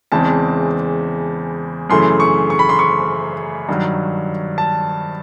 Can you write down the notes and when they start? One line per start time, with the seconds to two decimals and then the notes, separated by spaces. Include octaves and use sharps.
0.12 E2 C#3 E3 G#3 C4 A5
1.90 F#2 C#3 E3 A3 C6
2.20 C#6
2.50 C#6
2.59 B5
2.69 C6
2.79 C#6
3.69 G2 D#3 F#3
4.58 A5